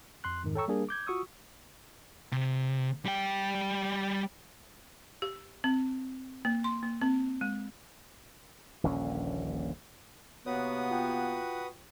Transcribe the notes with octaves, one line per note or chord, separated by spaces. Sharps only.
F2 C6 F#6
F2 G#2 D#3
A4 C#5 G5 A#5 C#6 E6
G3 A#3 D4 G#4 A#4
D6 G6 G#6
F4 F#4 C#6 D#6 E6
C3
G3 G5
G4
C4
A#3
C6
A#3
C4
G#3
D#1 A#1 D3 C#4
C3 A#3 B3 F#4 B4 C#5 D#6
F4 G5